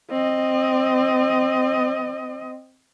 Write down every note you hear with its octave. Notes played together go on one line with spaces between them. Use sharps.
C4 D#5